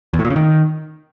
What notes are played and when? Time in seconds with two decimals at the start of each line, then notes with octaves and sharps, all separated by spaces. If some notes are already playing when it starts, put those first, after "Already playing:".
0.13 E2
0.19 A2
0.25 A#2
0.30 C#3
0.36 D#3